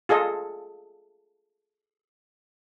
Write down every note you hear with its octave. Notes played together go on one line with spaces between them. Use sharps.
F4 G#4 A4 D#5